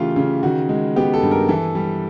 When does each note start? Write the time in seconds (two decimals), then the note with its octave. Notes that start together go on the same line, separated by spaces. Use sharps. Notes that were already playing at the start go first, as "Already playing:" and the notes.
Already playing: C#3 E3 A3 F4 G4
0.16 C#3
0.43 D#3 F#4
0.69 G#3
0.96 B3 G4
1.14 A4
1.22 G2
1.31 A#4
1.48 E3 A4
1.75 G3